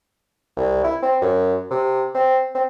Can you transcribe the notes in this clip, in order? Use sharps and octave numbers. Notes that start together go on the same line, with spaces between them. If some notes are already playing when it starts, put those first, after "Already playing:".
C2
E4
C4
F#2
C3
C4
C4